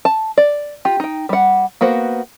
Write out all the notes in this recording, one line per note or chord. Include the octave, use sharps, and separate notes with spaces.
A5
D5
F4 G4
D#4 G5
G3 F#5
A#3 B3 F#4 C5